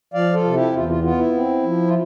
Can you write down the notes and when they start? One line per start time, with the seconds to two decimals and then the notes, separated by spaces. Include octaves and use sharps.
0.14 F3 D5 F5
0.33 F4 A4
0.44 C3
0.54 E4 G4
0.73 E2 F4
0.89 F4
1.03 B3 F4
1.19 E4
1.33 C4
1.63 F3
1.87 F4